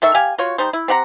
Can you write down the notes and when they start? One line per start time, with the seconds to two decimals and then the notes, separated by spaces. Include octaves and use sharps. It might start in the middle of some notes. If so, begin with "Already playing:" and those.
0.02 D#3 A4 E5 C#6
0.15 G4 F5 G#5
0.38 F4 F#4 C#5
0.58 G3 D#4 C5
0.73 E4
0.88 C4 G4 F#5 A#5